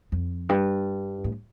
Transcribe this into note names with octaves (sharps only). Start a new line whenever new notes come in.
F2
G2
A2